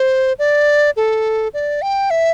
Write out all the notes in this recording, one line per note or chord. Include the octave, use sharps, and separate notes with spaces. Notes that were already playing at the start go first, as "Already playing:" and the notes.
Already playing: C5
D5
A4
D5
G5
E5